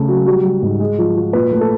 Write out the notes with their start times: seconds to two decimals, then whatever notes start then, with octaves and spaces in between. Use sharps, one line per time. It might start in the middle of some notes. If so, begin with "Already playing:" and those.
Already playing: C#3 A3
0.08 F#3
0.26 G3 F#4
0.44 G3
0.62 G#2
0.80 G#3
0.98 F3
1.16 F3
1.33 A#2 B4
1.51 A3
1.61 A4